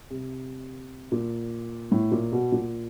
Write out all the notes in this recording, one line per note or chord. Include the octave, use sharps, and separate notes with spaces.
C3
A#2
A2
A#2
B2
A#2